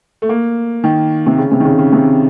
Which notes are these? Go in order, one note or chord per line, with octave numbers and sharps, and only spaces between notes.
A3
A#3
D#3
C3
C#3
C3
D#3
C#3
C#3
C3